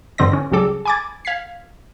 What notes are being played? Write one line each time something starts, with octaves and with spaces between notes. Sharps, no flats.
G2 D3 C4 D#5 A#6
C#4
C#2 F#3 G3 G#4 A4 D6
G#5 B5 D6 G#6 A6
F5 G#6 B6 C7